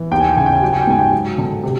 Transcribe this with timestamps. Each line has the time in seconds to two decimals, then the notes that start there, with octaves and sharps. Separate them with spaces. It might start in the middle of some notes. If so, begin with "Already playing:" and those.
Already playing: E3
0.11 D#2 G5
0.20 G#5
0.29 G5
0.37 C#3 G#5
0.46 G5
0.55 G#5
0.62 F#3 G5
0.73 G#5
0.81 G5
0.87 G#2 G#5
0.99 G5
1.12 F#3
1.38 D3
1.63 C3